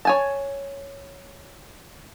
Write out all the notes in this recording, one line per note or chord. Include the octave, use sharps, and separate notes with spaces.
C#5 G#5 A5